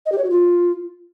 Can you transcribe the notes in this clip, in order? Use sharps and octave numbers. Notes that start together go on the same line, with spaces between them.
D#5
G4
C#5
F#4
F4